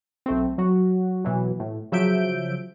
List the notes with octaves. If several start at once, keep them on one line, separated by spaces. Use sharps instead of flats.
B1 A3 C4
F#3 F#4
B2 E3 F#3
A2
C#3 F3 F#3 E5 G6 D7